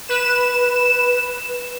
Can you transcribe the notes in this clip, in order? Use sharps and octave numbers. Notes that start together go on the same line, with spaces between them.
B4 E7